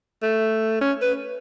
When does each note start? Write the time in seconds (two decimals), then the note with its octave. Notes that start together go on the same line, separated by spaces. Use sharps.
0.22 A3
0.81 C#4
1.02 B4